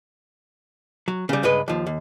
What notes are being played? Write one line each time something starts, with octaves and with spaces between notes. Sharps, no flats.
F#3
C#3 G3
C#2 G2 G#3 B4 D#5
D#2 F3
D#2